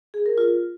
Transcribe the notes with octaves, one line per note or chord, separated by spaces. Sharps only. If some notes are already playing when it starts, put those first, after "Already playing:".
G#4
A#4
F4